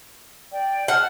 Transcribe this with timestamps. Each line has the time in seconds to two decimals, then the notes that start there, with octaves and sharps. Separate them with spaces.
0.52 D5 G5
0.88 F#5 A5 F6